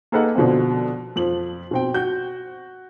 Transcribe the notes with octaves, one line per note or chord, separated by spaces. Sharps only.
A#3 G#4 A4 B4 D#5 F#5
B2 D3 F3 B3 C4
F2 F3 F#7
B2 C4 G5
F#4 G6